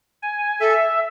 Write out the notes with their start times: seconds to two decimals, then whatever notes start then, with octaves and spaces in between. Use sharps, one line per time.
0.22 G#5
0.60 A4 E5